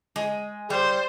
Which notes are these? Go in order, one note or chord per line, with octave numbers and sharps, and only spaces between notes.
G#3
G3 C5